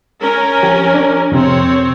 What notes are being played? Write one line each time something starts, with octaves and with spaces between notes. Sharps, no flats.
C#4 A#4
F3 G4
D4
F2 C3 C4 C#5